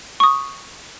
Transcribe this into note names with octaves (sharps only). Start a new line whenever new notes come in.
C#6 D#6